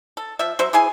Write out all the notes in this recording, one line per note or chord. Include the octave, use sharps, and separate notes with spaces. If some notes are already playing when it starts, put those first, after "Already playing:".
A4
F3 E5
F#3 C5 E5
E3 E4 G#4 G#5